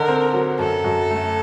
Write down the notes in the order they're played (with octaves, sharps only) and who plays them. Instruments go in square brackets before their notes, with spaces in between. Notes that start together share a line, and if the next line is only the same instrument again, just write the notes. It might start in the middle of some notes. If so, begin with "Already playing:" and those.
Already playing: [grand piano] D3 D#4 [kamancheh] A#4
[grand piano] C4
F#3
[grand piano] F#2 [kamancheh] A4
[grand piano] F#2
A3